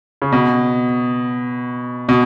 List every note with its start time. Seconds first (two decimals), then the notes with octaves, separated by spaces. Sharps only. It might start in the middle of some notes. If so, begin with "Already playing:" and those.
0.22 C#3
0.32 B2
2.09 B2